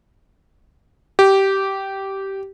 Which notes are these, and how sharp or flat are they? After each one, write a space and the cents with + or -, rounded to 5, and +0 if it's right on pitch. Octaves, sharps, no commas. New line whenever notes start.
G4 -15